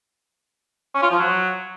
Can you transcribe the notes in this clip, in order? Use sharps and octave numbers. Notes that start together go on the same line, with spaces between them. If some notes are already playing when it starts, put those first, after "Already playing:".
C#4
F4
F3
F#3